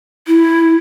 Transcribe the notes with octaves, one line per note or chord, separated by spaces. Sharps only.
E4